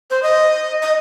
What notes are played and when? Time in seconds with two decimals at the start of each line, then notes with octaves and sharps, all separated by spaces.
0.11 C5
0.23 D#5
0.82 D#5